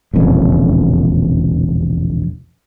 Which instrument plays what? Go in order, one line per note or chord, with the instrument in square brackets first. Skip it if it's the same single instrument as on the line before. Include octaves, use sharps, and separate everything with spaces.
[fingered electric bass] E1 A#1 F2 C#3